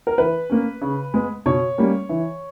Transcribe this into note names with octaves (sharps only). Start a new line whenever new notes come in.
A#4
E3 B4
A#3 C#4
C#3
G#3 B3
B2 C#5
G3 A#3 C#4
E3